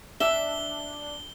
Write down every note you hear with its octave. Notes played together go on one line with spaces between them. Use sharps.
D4 E5 G7